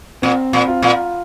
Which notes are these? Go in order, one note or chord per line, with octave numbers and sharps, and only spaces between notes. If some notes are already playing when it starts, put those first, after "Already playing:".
A#2 C4
A#2
F4
A#2